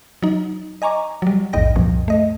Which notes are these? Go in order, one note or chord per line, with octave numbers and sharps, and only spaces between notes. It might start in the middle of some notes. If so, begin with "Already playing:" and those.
F#3 D#4
D#5 G#5 A#5 C#6 D6
F#3 G3
A#1 E2 G#2 D#5 G5 A#6
C2 F#2 A#2 F3
A3 D#5